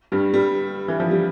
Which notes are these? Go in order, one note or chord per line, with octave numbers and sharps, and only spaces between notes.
G2 G3
G2 G3
E3
F3
G3